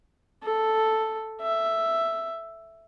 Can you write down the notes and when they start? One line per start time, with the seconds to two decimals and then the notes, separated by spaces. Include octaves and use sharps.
0.43 A4
1.42 E5